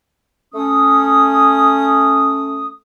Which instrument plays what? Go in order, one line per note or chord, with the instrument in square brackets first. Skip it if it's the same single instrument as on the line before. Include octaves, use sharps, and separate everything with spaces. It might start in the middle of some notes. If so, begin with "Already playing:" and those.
[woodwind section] A3 C#4 D#6